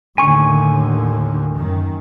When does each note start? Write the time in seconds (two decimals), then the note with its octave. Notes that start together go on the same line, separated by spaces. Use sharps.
0.18 D#2 A2 D3 G#5 C#6
1.56 F#2 D#3